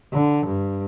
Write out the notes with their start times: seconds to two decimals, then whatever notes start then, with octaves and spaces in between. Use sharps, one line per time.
0.13 D3
0.46 G2